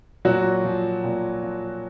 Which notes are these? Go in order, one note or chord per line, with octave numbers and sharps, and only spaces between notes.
A#2 F#3 F#4
F3
A#2
F3